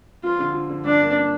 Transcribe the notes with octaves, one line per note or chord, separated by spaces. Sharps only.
F3 F4
D3
F3
D3
G2 D4
A#3
D4